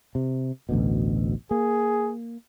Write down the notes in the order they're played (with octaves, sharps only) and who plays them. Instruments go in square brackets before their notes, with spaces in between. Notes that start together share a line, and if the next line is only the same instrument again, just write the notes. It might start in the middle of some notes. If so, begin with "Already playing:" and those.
[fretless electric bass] C3
A1 D2 B2
[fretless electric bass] A#3 [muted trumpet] G#4